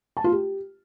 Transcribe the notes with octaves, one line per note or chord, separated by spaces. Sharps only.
A5
F4
G4